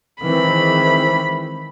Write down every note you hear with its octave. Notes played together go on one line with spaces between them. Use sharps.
D#3 E3 G#3 C4 B5